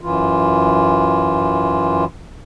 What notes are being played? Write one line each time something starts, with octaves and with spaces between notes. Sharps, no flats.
F#2 E3 F4